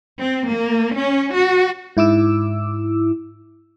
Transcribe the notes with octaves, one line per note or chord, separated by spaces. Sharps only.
C4
A#3
C#4
F#4
G#2 E4 D6 E6